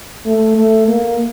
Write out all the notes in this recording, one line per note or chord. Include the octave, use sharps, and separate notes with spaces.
A3
A3
A#3